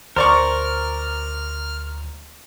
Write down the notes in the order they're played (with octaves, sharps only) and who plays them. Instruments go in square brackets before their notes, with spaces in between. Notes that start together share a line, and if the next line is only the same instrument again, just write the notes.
[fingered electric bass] D2 [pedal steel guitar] A#4 [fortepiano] C5 D5 C#6 [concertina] F6